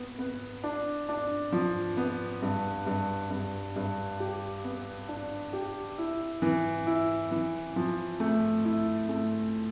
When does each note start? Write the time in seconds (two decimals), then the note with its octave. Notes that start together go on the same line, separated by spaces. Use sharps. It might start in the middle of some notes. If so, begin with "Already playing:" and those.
Already playing: B3
0.18 B3
0.64 D4
1.09 D4
1.52 F3
1.97 B3
2.42 G2
2.86 G2
3.30 G2
3.76 G2
4.19 G4
4.64 B3
5.09 D4
5.53 G4
5.98 E4
6.42 E3
6.87 E4
7.31 E3
7.76 F3
8.20 A3
8.64 E4
9.09 A3